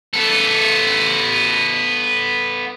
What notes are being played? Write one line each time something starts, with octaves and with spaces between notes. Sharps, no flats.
B3 A4